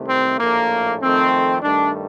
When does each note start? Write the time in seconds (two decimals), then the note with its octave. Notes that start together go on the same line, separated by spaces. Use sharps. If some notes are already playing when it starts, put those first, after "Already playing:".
Already playing: C2 C3 D#3 A3
0.08 C4
0.39 A#1 A2 A3 A#3
1.01 F2 D#3 A3 C4
1.62 G2 D#3 A3 D4